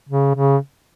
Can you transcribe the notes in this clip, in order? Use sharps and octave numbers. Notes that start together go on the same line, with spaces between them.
C#3
C#3